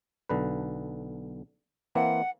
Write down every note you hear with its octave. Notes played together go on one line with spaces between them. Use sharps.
B1 D3 B4
E3 A#3 C4 F#5